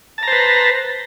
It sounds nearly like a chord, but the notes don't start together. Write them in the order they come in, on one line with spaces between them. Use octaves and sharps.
A5 A#5 C5 B4